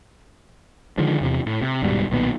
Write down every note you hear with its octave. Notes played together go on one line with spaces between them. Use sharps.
D3 D#3 F3 G#3
E2 C3
A2
C3
D#1 G#2 B2 G3
B1 A#2 D#3 B3